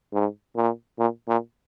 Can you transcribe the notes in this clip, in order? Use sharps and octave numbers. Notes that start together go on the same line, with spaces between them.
G#2
A#2
A#2
A#2